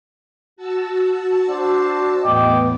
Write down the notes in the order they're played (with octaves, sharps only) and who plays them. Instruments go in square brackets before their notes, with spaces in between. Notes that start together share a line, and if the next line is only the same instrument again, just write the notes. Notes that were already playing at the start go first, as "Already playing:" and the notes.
[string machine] F#4 A5 E6
[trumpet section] D4 C5 D5
[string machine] E2 A2 B3 [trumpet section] D#5 G5 D6